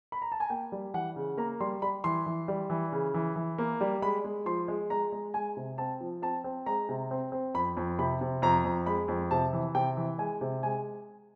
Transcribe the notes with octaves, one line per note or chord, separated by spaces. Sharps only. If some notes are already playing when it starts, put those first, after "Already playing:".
B5
A#5
A5
G#5
A#3 G5
G3
E3 F#5
C#3
A#3 A#5
G3 C6
G3 B5
E3 C6
E3
G3
E3
C#3
E3
E3
A#3
G3
G#3 B5
G#3
F3 C6
G#3
G#3 A#5
G#3
G#3 G#5
C3
C4 A5
F3
C4 A5
C4
G#3 A#5
C3
C4
C4
F2 B5
F2
C3 B5
C3
F2 A#5
F2
G#3 B5
F2
C3 A5
E3
C3 G5
E3
G#3 G#5
C3
G#3 G#5